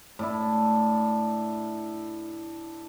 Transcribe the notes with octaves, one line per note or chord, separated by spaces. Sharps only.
A2 D4 E4